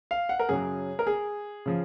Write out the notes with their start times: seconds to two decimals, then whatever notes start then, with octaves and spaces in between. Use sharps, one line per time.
0.11 F5
0.29 F#5
0.39 A#4
0.49 F#2 C#3 F#3 G#4
0.99 A#4
1.07 G#4
1.66 C#3 F3